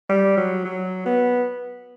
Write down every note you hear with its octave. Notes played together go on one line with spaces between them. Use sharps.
G3
F#3
F#3
B3